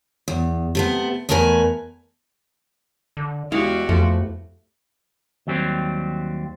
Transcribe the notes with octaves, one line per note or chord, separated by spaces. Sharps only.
E2
C3 A3 B3
E2 A3 A#4 B4 G#5
D3
E2 G#3 E4 F#4 G4 F5
F2 F3 A3
D#2 F#3 G3 C4